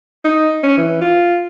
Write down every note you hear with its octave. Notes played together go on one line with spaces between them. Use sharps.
D#4
C#4
E3
F4